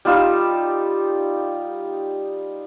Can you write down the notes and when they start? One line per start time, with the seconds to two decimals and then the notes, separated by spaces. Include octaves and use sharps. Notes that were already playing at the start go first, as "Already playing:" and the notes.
0.05 G3 D#4 F4 E6